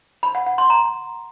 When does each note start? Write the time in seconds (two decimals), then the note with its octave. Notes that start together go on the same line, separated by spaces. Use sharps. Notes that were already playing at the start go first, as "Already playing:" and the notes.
0.23 B5
0.35 F#5
0.46 F#5
0.58 C6
0.70 A#5